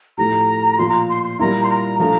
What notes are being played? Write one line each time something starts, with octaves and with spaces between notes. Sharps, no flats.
A2 F3 A3 E4 G4 A#5
A#2 F3 A#3 F4 C6
A#5
C6
C6
A#2 G3 A#3 E4 A#5
C6
A#5
F3 A3 D4 F4 A#5